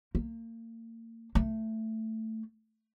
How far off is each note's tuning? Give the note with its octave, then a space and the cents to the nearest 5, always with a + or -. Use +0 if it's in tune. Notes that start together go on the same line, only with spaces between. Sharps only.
A#3 -35
A3 +10